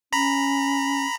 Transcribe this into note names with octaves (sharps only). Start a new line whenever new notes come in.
C#4 A#5 B5